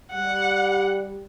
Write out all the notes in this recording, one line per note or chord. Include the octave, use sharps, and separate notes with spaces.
G3 F#5